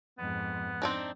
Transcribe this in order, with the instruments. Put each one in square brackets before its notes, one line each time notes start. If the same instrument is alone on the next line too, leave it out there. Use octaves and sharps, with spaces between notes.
[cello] F2 G#2 [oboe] B3
[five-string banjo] C4 D4 D#4